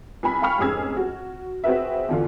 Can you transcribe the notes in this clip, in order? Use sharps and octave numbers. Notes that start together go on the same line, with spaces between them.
C2 G#5 B5
F5 G5 G#5 B5 C#6 F6
F1 G#2 C#4 G#4 E6 G#6
F#4
C4 F#4 G#4 B4 E5
E2 D3 F4